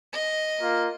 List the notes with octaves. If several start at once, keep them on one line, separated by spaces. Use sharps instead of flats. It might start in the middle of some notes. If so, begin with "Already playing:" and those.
D#5
A#3 F4